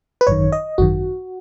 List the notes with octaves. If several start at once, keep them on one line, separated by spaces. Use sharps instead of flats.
B4
G#1 F#2 D#3 C#5
D#5
G#1 F#2 D#3 F#4